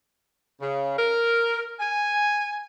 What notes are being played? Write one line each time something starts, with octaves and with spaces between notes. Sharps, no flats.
C#3
A#4
G#5